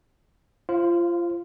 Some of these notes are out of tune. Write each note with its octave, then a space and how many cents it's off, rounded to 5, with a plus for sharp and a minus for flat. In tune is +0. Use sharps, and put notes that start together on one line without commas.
F4 -25 C5 +15 F5 +0